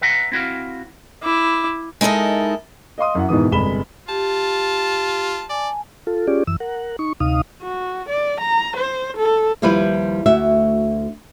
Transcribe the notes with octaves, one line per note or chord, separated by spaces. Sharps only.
B4 E5 F#5 A#5
C4 E4 F#4 F5
E4 D6
G#3 D#4 E4 A4 A#4
D#5 F5 C6 D#6
F#2 E4 F#5
G#2 B2 D#3 E3 D#6
G1 C3 G#3 B5 E7 G7
F4 G4 A5
D5 G#5 A5
F4 A4
C#4 F4 G4 G#4 D5
F#2 E3 E6
A#4 F#5
D#4 C#6
D2 C3 D#4 F5 D#6
F#4
D5
A#5
C5
A4
D#2 F3 G3 E4 F4 B4
D2 F#4 E5